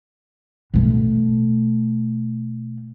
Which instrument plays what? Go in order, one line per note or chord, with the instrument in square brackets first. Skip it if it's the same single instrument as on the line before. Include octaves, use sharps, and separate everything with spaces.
[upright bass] B2 A3